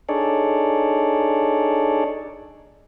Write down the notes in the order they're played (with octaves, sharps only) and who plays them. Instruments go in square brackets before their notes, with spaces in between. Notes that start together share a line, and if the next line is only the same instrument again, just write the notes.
[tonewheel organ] D4 D#4 G#4 A4 C#5 D5